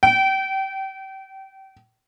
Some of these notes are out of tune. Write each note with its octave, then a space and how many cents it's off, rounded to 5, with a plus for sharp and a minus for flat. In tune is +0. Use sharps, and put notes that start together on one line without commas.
G5 -30